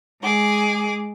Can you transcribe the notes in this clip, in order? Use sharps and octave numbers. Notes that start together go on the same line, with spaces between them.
G#3 G#4 D6